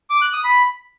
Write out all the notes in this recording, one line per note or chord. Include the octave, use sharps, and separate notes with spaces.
D6
F#6
D#6
B5